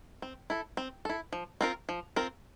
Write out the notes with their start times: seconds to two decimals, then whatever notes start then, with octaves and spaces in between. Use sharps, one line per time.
0.22 C4
0.50 E4 A4
0.77 C4
1.05 E4 A4
1.32 F3
1.61 C4 F4 A#4
1.89 F3
2.16 C4 F4 A#4